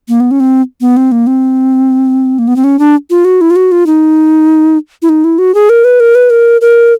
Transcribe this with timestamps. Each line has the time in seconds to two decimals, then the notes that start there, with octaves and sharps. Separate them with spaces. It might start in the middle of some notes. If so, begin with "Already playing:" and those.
0.09 A#3
0.20 B3
0.31 C#4
0.40 C4
0.81 B3
0.97 C4
1.12 A#3
1.27 C4
2.39 A#3
2.48 B3
2.56 C4
2.64 C#4
2.79 D4
3.10 F4
3.25 F#4
3.41 E4
3.50 F4
3.56 F#4
3.72 F4
3.86 D#4
5.02 E4
5.09 D#4
5.24 E4
5.38 F#4
5.55 G#4
5.69 A#4
5.84 B4
6.00 A#4
6.15 B4
6.30 A#4
6.61 A#4